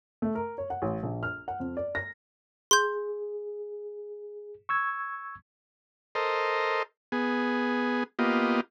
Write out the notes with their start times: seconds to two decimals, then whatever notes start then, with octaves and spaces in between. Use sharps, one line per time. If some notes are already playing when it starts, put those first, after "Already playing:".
0.22 A3
0.35 A#4
0.58 C#5
0.70 F#5
0.82 A1
1.03 A#1
1.23 F6
1.48 F#5
1.60 F2
1.77 D5
1.95 A#6
2.71 G#4 C6 G6
4.69 C#6 E6 G#6
6.15 A4 A#4 C5 D#5
7.12 B3 G#4
8.19 A#3 B3 F4 G4 D#5